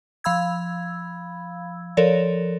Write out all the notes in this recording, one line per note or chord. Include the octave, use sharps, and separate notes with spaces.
F3 F5 B5 E6 G#6
F3 A4 A#4 C#5 D5